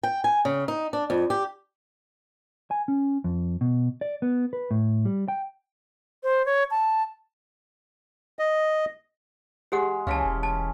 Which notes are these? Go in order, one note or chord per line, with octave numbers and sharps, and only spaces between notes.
G5
G#5
C#3
D#4
D4
F2
G4
G#5
C#4
F2
B2
D5
B3
B4
A2
G3
G5
C5
C#5
A5
D#5
G#3 G4 G#4 F#5
C#2 E3 C#4 F5 A5
E1
A5